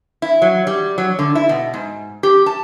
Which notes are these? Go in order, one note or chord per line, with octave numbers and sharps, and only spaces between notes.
E4
F#3
G3
F#3
D3
E4
B2
G#2
G4
A5